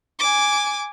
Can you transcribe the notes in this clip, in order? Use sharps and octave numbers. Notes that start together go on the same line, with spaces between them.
G#5 D6